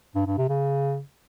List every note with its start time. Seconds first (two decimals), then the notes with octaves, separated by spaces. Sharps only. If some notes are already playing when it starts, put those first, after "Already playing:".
0.15 G2
0.27 G2
0.38 C3
0.49 C#3